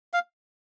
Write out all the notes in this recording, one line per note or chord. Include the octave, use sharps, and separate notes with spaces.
F5